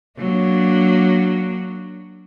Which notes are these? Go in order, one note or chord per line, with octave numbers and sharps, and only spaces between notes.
F#3 A#3 D4